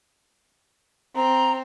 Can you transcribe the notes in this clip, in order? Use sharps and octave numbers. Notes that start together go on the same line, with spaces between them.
C4 A#5